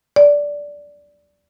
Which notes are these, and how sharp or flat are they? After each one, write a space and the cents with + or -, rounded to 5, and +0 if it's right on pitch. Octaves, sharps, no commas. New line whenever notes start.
D5 -10